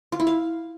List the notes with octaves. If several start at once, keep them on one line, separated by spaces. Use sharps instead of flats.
F4
E4
F5